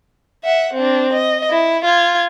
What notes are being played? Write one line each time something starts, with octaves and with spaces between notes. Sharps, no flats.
E5 F#5
C4 D4
D#5
E4
F4 G#6